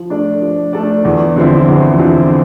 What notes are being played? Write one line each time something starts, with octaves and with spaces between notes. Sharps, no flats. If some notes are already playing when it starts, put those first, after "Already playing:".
Already playing: F3
A3 D4 A4 D5
F3
A3 D4 A4 D5
E2
D3 F3 C4 E4
E2
D3 F3 C4 E4